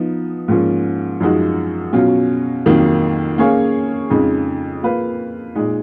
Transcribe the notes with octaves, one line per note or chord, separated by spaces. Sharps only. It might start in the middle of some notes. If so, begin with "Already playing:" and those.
Already playing: F3 B3 D#4
G#2 F3 A#3 C#4 F4
F#2 F3 G#3 D#4 F#4
B2 F#3 C#4 F4
F2 D#3 F#3 A#3
A#3 C#4 G#4 C#5 F5
F2 C#3 G#3 D#4
A#3 F4 B4 F5
A#2 G#3 D#4